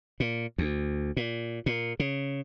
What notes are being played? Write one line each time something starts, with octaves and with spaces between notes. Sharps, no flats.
A#2
D2
A#2
A#2
C#3